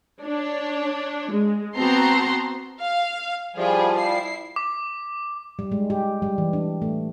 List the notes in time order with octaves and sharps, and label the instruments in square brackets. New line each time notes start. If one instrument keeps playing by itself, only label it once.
[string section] D4 C#5
G#3
B3 C4 F#4 A5 A#5 C6
[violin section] F5
[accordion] F3 G3 [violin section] E4 F4 G#4
[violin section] E4 C7
[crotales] D6
[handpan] G3
G#3
G4
G3
E3
D4
A3